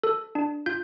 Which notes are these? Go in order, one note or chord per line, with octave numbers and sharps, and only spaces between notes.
A4
D4
F4 G6